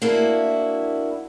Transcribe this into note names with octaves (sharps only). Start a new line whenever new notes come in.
A#3 D4 E4 F#4